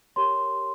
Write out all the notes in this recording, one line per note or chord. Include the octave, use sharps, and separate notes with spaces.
G4 A#4 C#5 C6